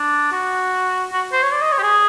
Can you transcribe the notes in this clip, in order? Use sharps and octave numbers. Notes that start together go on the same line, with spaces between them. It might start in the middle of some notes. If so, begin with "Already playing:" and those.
Already playing: D4
F#4
F#4
C5
C#5
D5
D#5
C#5
G4
G#4